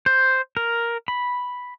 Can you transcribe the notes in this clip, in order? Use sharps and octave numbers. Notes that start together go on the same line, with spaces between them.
C5
A#4
B5